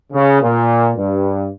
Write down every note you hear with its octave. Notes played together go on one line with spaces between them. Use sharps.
C#3
A#2
G2